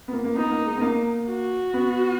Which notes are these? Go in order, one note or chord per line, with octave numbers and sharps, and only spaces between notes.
B3
A#3
A#3
B3 D#4
A#3
G#3
B3
A#3
F#4
B3